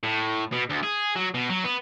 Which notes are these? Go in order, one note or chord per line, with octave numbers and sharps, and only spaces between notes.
A2
B2
D2
G#4
F#3
B2
F#3
B3